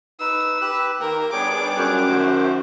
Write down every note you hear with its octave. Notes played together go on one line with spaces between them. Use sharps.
D#4 B4 E6
G4 B4 F#6
D#3 A#3 A#4 G5
G3 B3 D4 G#4 C#5 G5 D6
F#2
D#3 A3 F#4 C5